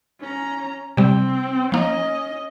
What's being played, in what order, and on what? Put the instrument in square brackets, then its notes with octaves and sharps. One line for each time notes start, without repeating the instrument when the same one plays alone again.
[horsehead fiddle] C#4 A#5
[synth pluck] C3 G3 [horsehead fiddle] C4
[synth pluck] F3 A#3 [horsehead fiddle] C#4 D#5